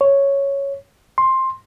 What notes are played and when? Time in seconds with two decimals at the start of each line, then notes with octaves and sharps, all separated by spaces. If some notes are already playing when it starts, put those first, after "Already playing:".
0.01 C#5
1.18 C6